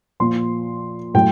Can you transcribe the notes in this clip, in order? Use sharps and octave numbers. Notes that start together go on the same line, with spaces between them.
A#2 F3 C6
A2 F#3 G5